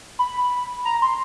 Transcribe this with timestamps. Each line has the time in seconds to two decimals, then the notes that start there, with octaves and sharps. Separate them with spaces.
0.19 B5
0.85 A#5
1.02 C6